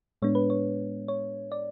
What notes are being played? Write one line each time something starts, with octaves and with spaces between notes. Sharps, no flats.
A2 G#3 B3 D4 C#5
B4
C#5
C#5
D5